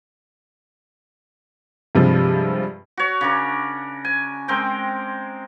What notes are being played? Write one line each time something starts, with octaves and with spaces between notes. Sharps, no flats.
G2 C3 F3 G#3
F#4 C#5
C#3 D4 A#4
G#5
G#3 C4 A#4 G5